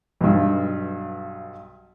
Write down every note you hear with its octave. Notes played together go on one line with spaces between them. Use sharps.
B1 G2